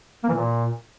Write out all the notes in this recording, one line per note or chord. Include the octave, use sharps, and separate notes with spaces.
A#3
E3
A#2